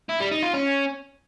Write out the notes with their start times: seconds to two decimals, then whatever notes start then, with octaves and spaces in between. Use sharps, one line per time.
0.09 E4
0.20 G3
0.31 D#4
0.43 F4
0.54 C#4